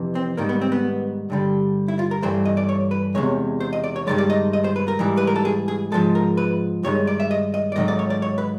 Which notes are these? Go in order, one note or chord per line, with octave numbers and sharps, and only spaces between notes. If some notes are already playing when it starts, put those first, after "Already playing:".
Already playing: F2 C3 E3
C4
G#2 D#3 G3 A#3
B3
C4
B3
G2 D3 G3
E4
F4
A#4
G2 E3 A3 C5
D#5
D5
C#5
B4
E2 C3 D#3 G#3 C#5
C5
D#5
D5
C#5
G2 D#3 G#3 D5
D5
D#5
D#5
C5
B4
A#4
G#2 E3 G3
B4
A#4
A4
G#4
G#4
G#2 F3 G#3 A4
A#4
B4
G2 D#3 G#3 C#5
D5
E5
D#5
D#5
D5
G#2 D#3 F#3 A3 D#5
D5
C#5
D5
C#5
B4